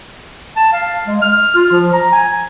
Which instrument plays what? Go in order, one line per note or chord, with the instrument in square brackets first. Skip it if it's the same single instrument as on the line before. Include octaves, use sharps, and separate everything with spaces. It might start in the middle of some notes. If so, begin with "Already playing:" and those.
[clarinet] A5
F5
G#3
F6
F4
F3
A#5
G#5